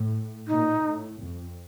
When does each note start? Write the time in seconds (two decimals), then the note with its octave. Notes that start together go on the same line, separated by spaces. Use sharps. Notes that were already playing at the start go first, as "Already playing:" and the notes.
Already playing: A2
0.48 A#2 D#4
0.84 A2
1.20 F2